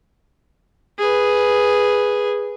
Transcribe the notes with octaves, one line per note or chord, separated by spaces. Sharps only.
G#4 B4